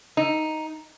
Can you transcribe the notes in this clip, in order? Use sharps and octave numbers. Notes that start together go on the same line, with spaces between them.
D#4